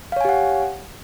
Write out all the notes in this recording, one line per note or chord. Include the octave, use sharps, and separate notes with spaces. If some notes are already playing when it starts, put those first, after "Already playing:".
G4 C#5 F5 F#5 G#5